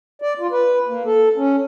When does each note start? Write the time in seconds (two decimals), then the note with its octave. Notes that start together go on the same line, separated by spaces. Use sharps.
0.22 D5
0.40 F4
0.52 B4
0.89 A#3
1.06 A4
1.36 C#4